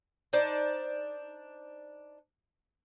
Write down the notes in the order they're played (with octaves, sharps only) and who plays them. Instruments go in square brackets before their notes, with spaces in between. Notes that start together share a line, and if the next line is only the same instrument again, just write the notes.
[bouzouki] D4 D#4 C5 D5